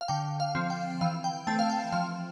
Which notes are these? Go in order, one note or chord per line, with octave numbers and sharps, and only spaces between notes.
F5
D3 G5
F5
F3 C4
G5
E3 F5
G5
A3 C4 A5
F5
G5
F3 F5